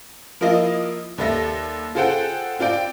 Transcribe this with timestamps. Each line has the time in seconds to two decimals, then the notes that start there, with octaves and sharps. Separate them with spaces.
0.41 F3 A#3 E4 F4 D#5
1.18 D#2 G3 A4 E5 A#6
1.95 F4 G#4 A4 C5 F#5 G5
2.59 C4 F4 D5 G5